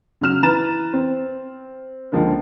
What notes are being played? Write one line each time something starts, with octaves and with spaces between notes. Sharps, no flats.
C#3 F#3 F6 E7
E3 B4 A#5 A6 E7
C4
C#2 D3 F3 G#3 A#3